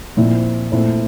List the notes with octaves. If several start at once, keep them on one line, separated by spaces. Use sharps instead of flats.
A#2 F3 C4 E4
A#2 A3 C4 E4